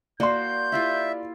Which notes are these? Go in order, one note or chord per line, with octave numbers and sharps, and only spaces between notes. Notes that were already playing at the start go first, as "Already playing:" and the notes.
A#3 F#4 C5 D5 C6 G6
E4 F4 G4 E5